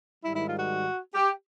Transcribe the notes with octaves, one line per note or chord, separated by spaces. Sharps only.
G#2 D#3 G3 E4
E4
F4
F#4
G4